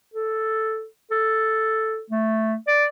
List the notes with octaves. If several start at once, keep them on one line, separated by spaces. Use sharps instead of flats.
A4
A4
A3
D5